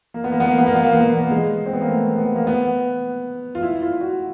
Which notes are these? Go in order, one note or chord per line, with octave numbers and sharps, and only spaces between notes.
A#3
B3
A#3
B3
A#3
B3
A#3
B3
A#3
B3
A#3
B3
A#3
G#3
C4
B3
A#3
A3
B3
A#3
B3
F4
E4
F4
F#4